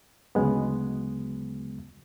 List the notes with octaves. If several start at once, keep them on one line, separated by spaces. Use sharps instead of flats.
D2 C#3 F#3 G#3 B3